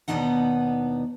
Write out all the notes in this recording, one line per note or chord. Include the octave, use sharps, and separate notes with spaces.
D#2 B2 B3 D4 D#4 F#5